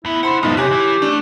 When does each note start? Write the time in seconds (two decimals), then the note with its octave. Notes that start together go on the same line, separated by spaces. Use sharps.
0.05 D2 B3 E4
0.23 D4 C5 F#5 B5 C6
0.43 B1 G#2 B3 D#4 A4
0.57 C3 G4 C#5 G#5 F#6
0.71 E3 E4
1.02 A3 D4